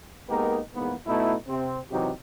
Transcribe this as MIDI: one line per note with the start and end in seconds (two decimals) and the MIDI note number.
0.29 0.59 56
0.29 0.59 58
0.29 0.59 59
0.29 0.59 63
0.29 0.59 67
0.29 0.59 70
0.75 0.94 34
0.75 0.94 40
0.75 0.94 44
0.75 0.94 58
0.75 0.94 59
1.07 1.35 47
1.07 1.35 57
1.07 1.35 59
1.07 1.35 63
1.07 1.35 64
1.49 1.79 48
1.49 1.79 60
1.91 2.10 48
1.91 2.10 52
1.91 2.10 54
1.91 2.10 63
1.91 2.10 67